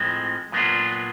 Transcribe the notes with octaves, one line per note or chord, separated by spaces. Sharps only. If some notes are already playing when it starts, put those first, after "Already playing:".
Already playing: A2 F3 G#3 C4
A#2 F#3 B3 D4 F4